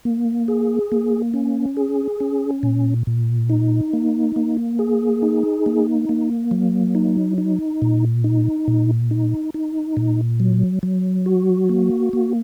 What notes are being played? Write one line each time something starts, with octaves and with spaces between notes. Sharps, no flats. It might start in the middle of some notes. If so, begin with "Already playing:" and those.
A#3
G#4
A#3
C#4
G#4
C#4
A#2
A#2
D#4
A#3
A#3
G#4
D#4
A#3
A#3
F#3
D#4
D#4
A#2
D#4
A#2
D#4
D#4
A#2
F#3
F#3
F#4
A#3
A#3